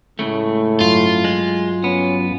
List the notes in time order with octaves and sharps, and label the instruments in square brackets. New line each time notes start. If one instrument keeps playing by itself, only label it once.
[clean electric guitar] C#2 C#3 A3 [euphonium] A2
[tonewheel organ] G2 F#3 [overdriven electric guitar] F4
[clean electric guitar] G#3
[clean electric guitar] B3 [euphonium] C#4